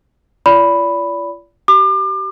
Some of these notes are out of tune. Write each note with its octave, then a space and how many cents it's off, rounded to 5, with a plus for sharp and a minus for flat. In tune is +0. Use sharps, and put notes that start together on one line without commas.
F4 -35 D5 -35 B5 +0
G4 -30 D6 +35